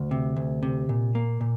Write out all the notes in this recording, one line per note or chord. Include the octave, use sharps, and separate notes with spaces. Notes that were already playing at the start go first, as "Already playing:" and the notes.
Already playing: D2
C3
D2
C3
A#2
A#3
A#2